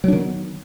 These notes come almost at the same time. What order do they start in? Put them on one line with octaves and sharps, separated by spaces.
F#3 D4 D#3 B3